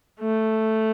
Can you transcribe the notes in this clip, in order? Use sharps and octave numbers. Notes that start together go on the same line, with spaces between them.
A3